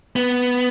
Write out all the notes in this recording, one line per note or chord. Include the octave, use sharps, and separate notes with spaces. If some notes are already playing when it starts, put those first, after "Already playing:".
B3